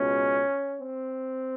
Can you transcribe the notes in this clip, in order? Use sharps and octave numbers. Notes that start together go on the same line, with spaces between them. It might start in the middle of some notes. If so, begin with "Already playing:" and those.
Already playing: C#2 B2 C#4
C4